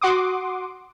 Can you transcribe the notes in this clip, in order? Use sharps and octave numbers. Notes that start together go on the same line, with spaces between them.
F#4 F#5 C6 D6 D#6